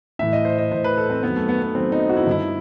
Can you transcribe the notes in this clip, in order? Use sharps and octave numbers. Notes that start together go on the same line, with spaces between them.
A2 E3 E5
D#5
C5
D#5
A2 E3 C5
B4
A4
C4
F#2 D#3 B3
A3
B3
B3
F#2 D#3 C4
D#4
F#4
E4
D#4
G2 D#3 E4